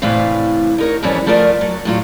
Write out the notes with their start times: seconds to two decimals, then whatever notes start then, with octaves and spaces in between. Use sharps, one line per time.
0.02 A2 C3 E3 G3 F5
0.78 D#4 A#4 C#5
1.03 F2 G#2 E3 G3 C#4
1.26 F3 A3 F4 A#4 D5
1.61 F#3
1.85 A2 F#3 F4